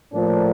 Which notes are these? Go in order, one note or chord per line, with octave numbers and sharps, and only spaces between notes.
A2 F3 A#3 D4